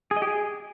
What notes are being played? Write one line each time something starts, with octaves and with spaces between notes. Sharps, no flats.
G#4
D#5
G4
G#4